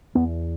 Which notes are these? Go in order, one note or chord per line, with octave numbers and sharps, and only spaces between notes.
E2 B3